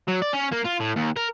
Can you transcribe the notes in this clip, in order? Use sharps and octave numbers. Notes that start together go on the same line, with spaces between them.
F#3
D5
C#4
A#3
F4
A2
D#2
A#4